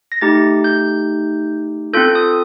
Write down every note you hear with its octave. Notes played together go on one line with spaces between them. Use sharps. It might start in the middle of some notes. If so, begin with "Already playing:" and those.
A#6
A3 D#4 G4 A6
G6
C4 F4 A4 G6
D#6